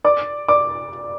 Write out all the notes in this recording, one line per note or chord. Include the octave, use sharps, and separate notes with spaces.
D5 D6
D5 D6